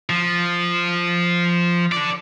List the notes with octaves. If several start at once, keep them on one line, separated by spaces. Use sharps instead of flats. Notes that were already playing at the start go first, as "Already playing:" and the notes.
F3
A4 D5